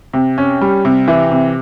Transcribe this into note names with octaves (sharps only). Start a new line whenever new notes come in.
C3
C#4
G3
C3
E3
C3